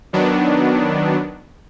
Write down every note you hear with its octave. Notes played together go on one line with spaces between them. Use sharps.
D#3 F#3 B3 D4